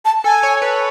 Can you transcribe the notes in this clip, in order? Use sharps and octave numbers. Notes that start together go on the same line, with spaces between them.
A5
A4 G#5
C#5
B4